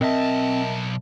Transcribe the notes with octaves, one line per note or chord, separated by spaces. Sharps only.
B1 C4 A#4 D#5 E5 A5